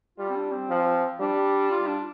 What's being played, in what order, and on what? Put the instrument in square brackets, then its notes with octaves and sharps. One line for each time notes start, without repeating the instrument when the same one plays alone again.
[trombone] G3 [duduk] F4
[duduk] C4
D4
C4
[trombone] F3
[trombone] G3 [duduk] D4
[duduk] F4
D4